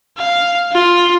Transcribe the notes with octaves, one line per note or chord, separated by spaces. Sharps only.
F5
F4